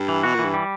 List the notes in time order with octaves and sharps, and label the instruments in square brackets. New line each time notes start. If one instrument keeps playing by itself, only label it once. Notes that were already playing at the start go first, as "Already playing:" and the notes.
Already playing: [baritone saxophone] G2
[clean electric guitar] E3
[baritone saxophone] B2 [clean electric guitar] F#4
[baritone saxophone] A#2 [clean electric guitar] E3
[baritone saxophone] G2
[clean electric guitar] G3